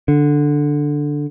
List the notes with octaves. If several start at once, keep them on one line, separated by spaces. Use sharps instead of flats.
D3